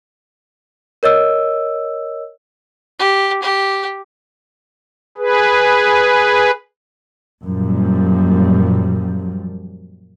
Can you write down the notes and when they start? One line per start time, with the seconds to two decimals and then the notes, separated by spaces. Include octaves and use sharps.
1.03 A#4 C#5 D#5 E6
2.99 G4
3.43 G4
5.18 G#4 B4
7.44 F#2 A#2 F3 G3